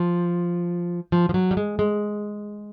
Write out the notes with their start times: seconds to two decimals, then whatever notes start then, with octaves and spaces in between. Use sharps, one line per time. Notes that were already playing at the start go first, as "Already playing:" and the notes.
Already playing: F3
1.12 F3
1.29 F3
1.34 F#3
1.51 G3
1.57 G#3
1.79 G#3